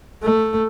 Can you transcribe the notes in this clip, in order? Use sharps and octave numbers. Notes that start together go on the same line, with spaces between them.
A3